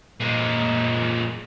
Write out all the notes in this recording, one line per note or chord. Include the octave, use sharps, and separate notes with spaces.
A#2 G#3